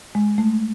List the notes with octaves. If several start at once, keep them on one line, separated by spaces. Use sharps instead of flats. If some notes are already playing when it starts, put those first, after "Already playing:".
G#3
A3